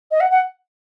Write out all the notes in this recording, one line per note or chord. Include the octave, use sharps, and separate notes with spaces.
D#5
F#5
F#5